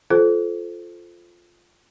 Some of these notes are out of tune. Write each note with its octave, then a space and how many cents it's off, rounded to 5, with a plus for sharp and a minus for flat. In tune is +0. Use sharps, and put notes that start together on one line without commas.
F4 +0 A4 -20 C5 -10